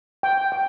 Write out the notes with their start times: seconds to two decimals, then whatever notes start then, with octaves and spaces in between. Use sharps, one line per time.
0.23 G5
0.52 G5